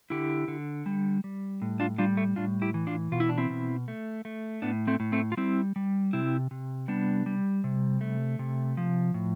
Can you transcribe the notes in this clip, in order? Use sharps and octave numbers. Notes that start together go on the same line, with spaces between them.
D3 E4 G4
D3
G3
G3
A2
D4 F4
G3 D4 F4
A3
A2 D4 F4
E4 G4
E3
D4 F4
B2 F4
E4
D4
C4 E4
B2
A3
A3
A2 B3 D4
A3 C4
A2
A3 C4
F4
G3 C4 E4
G3
C3 C4 E4
C3
G3 B3 D4
G3
C3
A3
C3
F3
A2